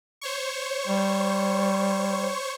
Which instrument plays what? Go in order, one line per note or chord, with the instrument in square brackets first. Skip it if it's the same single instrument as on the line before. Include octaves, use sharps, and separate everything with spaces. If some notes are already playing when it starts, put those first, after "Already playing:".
[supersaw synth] C5 C#5 C#6
[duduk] G3